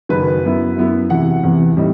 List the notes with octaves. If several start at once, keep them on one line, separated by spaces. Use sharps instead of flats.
F#1 F#2 D#3 F#3 B4
F#2 F#3 B3 E4
F#2 F#3 B3 E4
E2 C3 E3 F#5
E2 C3 E3
A2 G3 C4 D#4